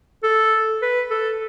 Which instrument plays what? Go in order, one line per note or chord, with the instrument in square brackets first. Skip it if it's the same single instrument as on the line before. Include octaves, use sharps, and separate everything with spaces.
[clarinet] A4
B4
A4